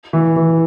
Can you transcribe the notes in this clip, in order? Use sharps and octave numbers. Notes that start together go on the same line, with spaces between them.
E3
E3